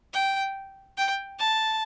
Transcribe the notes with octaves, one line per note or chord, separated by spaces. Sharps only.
G5
G5
A5